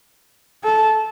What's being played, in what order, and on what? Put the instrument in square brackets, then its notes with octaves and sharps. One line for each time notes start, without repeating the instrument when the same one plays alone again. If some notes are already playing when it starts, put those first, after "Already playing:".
[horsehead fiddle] A4